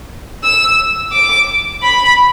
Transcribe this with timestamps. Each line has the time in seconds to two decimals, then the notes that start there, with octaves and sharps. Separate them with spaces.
0.44 E6
1.12 D6
1.83 B5